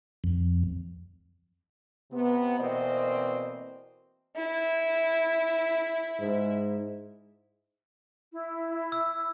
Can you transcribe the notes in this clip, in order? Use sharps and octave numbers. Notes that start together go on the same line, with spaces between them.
F2
C3 B3
B2 E3 A#3 C4 D5 D#5
E4
G#2
E4
E6